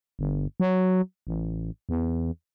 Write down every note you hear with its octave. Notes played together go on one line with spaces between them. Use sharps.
G1
F#3
A1
E2